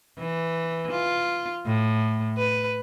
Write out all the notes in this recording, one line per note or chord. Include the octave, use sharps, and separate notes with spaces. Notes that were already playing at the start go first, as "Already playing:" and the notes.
E3
F4
A2
B4